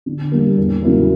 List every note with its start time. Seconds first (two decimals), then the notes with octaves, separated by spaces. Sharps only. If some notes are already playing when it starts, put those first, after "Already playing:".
0.06 D3
0.32 G3 A#3
0.57 E2
0.83 C#3 F#3 A#3 E4